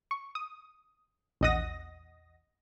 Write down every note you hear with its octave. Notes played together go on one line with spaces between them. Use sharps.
C#6
D#6
A#1 E2 D#5 F#5 D#6 A#6